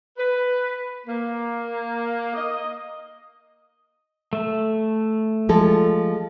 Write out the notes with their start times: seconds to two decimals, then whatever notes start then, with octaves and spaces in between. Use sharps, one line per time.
0.18 B4
1.07 A#3
2.34 D#5
4.33 A3 E5
5.49 F3 G#3 A4